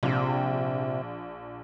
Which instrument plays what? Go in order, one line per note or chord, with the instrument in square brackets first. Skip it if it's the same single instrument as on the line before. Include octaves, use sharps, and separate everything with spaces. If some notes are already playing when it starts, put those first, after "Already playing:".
[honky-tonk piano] A#1 [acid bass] C3